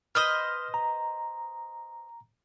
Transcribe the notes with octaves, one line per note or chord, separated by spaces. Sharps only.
B4 C5 D#5 F6
A#5